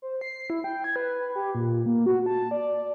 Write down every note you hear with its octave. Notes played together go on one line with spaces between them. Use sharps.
C5
C7
E4
G5
G#6
B4
G4
A#2
A#3
F#4
A5
D5